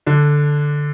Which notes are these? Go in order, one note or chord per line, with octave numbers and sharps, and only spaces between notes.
D3 D4